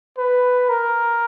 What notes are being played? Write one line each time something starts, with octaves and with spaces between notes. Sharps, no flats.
B4
A#4